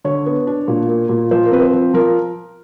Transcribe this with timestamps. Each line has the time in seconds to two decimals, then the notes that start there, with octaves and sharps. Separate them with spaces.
0.04 D3 C#5
0.26 B3
0.47 D4
0.68 A#2
0.89 A#3
1.09 A#2
1.31 F3 C5
1.45 A#4
1.51 C4 B4
1.62 C5
1.73 F3
1.94 F3 A#4